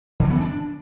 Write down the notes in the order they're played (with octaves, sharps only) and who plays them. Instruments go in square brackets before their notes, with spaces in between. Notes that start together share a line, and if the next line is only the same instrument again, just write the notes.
[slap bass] D3
F#3
B3
E3
D4